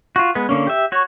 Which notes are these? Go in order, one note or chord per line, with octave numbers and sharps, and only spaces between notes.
F4 F#4
G#3 B3 B4
D3 A#3 C#4
G4 E5
F#4 C#5